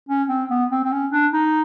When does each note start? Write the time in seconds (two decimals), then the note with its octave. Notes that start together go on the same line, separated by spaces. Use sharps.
0.09 C#4
0.29 C4
0.50 B3
0.71 C4
0.84 C4
0.92 C#4
1.12 D4
1.33 D#4